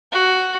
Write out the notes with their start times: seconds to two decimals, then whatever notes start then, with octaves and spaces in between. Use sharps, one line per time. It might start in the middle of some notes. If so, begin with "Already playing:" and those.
0.12 F#4